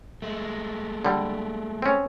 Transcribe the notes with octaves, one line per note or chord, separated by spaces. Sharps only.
G#3 A3
D3 G3
C4 C#4